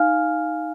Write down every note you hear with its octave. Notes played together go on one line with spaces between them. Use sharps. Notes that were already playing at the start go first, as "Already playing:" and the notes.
Already playing: D#4 F5 G#5 F6